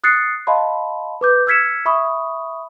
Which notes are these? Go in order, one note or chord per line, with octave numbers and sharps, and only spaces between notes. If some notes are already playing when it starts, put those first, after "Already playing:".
D#6 F#6 A6 C7 C#7
D#5 F5 A5 B5 C6
B4 D6 G6
E6 F6 G#6 B6 C#7 E7
E5 B5 C#6 D#6